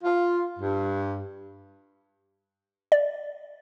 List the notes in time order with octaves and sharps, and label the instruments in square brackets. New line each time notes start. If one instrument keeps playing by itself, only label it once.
[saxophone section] F4
G2
[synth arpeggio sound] D5